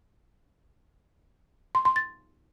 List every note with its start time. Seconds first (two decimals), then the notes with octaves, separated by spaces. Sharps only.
1.75 C6
1.85 C6
1.96 A6